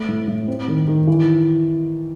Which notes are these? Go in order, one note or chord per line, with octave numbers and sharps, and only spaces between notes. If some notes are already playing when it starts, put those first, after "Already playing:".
Already playing: A3
A2
A2
C4
D#3
D#3
E3